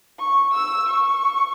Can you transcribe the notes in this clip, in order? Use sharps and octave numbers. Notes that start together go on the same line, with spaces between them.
C#6
E6
C#6